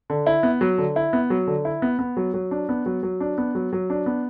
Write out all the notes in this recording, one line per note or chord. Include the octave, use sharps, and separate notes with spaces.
D3
E4
B3
F#3
D3
E4
B3
F#3
D3
E4
B3
B3
F#3
F#3
D4
B3
F#3
F#3
D4
B3
F#3
F#3
D4
B3